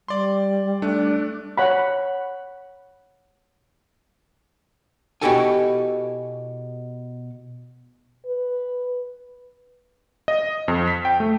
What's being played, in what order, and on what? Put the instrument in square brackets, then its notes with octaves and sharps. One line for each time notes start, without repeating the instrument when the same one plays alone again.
[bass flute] G3 [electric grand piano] D5 C6
[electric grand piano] A3 [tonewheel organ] D4
[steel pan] C#5 F#5 B5
[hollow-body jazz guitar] B2 E4 F#4 G4 A4 G#5
[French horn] B4
[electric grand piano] D#5
F2
B6
G5
A3